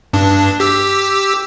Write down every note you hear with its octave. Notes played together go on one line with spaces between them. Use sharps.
G2 D4
G4 E6